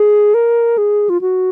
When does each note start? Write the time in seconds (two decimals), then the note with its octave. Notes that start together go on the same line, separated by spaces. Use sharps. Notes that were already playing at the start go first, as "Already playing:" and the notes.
Already playing: G#4
0.34 A#4
0.78 G#4
1.09 F4
1.21 F#4